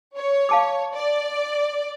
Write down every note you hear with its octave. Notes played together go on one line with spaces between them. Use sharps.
C#5
F5 A5 D6
D5